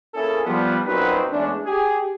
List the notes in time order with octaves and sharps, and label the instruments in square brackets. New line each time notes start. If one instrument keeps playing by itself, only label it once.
[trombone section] A#3 C#4 E4 G#4 A4
F3 G3 B3
F#2 A#2 C4 D#4 F#4 B4
E2 G#3 A3 C#4 D4
G4 G#4